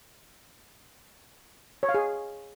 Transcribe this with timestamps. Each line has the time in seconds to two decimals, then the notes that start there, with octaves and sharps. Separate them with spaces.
1.83 C#5
1.89 F5
1.94 G#4